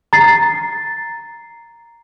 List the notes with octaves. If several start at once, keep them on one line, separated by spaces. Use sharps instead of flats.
A#5 A6 C7